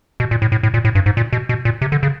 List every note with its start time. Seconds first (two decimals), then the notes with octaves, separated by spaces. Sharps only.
0.20 B2
0.31 A#2
0.42 A2
0.52 A2
0.63 A2
0.74 A#2
0.85 A2
0.95 G2
1.06 G#2
1.17 A#2
1.33 B2
1.49 B2
1.65 A#2
1.82 C3
1.92 D3
2.03 C#3